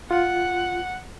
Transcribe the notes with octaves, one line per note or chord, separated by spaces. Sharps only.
F4 F#5